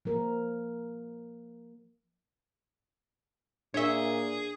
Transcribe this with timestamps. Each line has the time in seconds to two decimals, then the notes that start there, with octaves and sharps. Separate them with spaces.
0.05 F3 A#3 A#4
3.74 A#2 D4 G#4 C#5 E5 G7